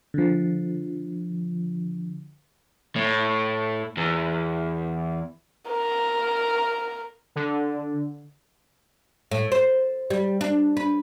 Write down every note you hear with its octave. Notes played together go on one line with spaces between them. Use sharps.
D3 F3
A2
E2
A#4
D3
A2
C5
G3
D4
B4